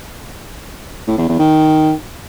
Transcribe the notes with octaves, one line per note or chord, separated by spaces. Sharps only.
A2
E2
E2
D#3